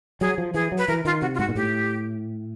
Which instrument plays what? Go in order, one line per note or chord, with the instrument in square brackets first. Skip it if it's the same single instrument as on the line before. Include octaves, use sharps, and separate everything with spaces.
[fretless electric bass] F#3 [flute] G#4
[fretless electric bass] F3
[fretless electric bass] E3 [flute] G#4
[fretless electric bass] F#3
[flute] B4
[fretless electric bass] E3 [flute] A#4
[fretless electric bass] D#3 [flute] F4
[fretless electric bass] C3 [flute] F#4
[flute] F4
[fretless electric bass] G#2 [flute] F#4
[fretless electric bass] A#2
[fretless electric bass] A2 [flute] G4